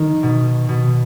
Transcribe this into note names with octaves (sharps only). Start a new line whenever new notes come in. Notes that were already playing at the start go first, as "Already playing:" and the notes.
Already playing: D#3
B2
B2